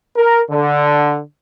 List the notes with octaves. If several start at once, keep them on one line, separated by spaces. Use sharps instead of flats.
A#4
D3